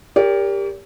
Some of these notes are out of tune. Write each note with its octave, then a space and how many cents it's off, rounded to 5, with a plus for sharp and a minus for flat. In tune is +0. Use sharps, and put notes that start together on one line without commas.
G4 +20 A#4 +0 D5 -45